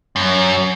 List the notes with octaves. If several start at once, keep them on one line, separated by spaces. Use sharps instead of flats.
F#2